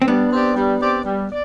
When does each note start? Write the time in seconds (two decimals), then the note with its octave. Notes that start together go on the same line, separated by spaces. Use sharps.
0.02 C4
0.07 G3 B3 D4
0.32 C4 G4 D5
0.55 G3
0.81 C4 G4 D5
1.05 G3
1.29 D5